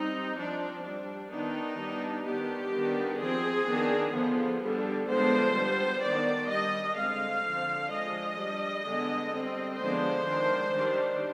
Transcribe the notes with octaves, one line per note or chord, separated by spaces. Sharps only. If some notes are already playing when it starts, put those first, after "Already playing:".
Already playing: G3 C4 D#4
F3 C4 D4
G3 D4
D#3 B3 D4 D#4
G3 B3 D4
D#3 B3 D4 G4
D#3 G3 B3 D4
F3 C4 G#4
D#3 B3 D4
D3 F3 B3
D3 G3 B3 D4
D3 F3 G#3 B3 D4 C5
G3 B3 D4
D#3 B3 D4 D5
G3 D4 D#5
D3 G#3 C4 F5
D3 F3 C4
F3 G#3 D4 D#5
G3 D4
D3 G#3 B3 D4
G3 C4
D3 F3 G#3 B3 D4 C5
D#3 G#3 D4
D#3 G3 D4